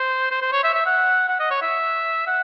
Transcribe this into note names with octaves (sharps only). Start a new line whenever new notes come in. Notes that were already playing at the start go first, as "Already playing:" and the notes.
Already playing: C5
C5
C5
C#5
E5
E5
F#5
F#5
D#5
C#5
E5
F#5